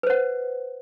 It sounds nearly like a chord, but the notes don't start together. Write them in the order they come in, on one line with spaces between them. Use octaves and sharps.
B4 C5 F#5